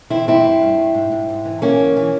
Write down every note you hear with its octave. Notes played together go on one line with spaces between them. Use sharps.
E3 C4 E4
G2 C4 E4
G2
G2
G2
G#2
G#2
G#2
E3
G#2 A#3 C#4
E3
E3